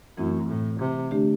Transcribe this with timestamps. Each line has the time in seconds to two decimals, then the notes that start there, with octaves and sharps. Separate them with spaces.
0.17 F#2 E3 A3 C4 E4
0.48 A2
0.80 C3
1.11 D3 A3 D4 G4